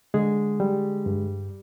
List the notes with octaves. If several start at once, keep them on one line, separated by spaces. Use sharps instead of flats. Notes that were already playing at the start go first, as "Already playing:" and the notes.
D3 G#3 G#4
G3
G2